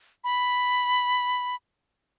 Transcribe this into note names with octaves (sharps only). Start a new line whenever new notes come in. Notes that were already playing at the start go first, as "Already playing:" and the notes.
B5